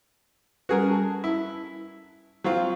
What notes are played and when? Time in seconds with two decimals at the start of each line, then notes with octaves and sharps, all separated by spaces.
0.69 G3 C#4 F#4 G#4 A#4 B4
0.91 A5
1.24 E4
2.44 F#3 C4 F4